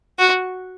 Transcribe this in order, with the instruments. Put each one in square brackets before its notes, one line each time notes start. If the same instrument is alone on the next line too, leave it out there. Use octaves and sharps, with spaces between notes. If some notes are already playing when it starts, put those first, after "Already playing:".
[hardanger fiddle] F#4